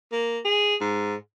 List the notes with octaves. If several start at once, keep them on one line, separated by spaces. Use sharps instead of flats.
A#3
G#4
G#2